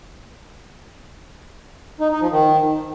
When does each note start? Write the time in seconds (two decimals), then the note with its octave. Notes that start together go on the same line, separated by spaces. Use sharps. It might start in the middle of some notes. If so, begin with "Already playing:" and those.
2.00 D#4
2.11 D#4
2.21 F3
2.31 D#3